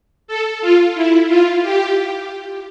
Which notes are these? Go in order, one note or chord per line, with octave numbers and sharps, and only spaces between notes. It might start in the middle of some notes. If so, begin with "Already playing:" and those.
A4
F4
E4
F4
G4